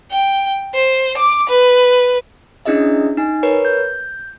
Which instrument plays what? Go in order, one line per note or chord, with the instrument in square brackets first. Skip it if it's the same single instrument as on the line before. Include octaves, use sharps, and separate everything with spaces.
[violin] G5
C5
D6
B4
[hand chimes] C#4 D4 E4 G#4 D#5 E5
D#4 G#5
A#4 B4 C#5
G6